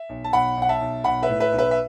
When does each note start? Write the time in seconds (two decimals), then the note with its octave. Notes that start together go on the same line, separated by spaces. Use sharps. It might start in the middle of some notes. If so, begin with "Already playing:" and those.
Already playing: E5
0.09 B1
0.24 A5
0.33 B1 F#5 B5
0.57 B1 F#5
0.69 E5 A5
0.81 B1
1.04 B1 F#5 B5
1.23 B4 E5
1.28 A2
1.40 B4 E5
1.52 B1
1.58 B4 E5
1.71 E5